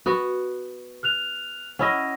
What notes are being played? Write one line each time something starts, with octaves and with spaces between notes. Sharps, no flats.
B3 F#4
F6 F#6 F7
C#4 E4 D#5 F#5 A#6